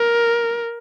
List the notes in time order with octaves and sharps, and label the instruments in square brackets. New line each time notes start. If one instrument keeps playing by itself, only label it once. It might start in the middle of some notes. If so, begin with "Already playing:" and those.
Already playing: [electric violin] A#4